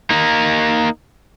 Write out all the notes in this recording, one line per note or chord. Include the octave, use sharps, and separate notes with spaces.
A#3 D#4